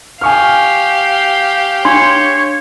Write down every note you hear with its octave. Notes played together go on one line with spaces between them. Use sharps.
G4 F5 G#5 C#6 F6
D4 C#5 C6